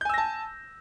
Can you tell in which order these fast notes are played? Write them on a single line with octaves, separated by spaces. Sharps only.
G6 G#5 E6 A#6 A5